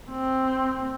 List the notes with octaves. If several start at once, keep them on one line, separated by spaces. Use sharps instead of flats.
C4